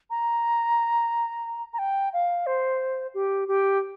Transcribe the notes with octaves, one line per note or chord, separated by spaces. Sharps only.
A#5
A#5
G5
F5
C5
G4
G4